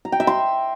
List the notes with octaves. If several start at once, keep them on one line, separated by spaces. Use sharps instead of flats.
A#5
G5
E5
C6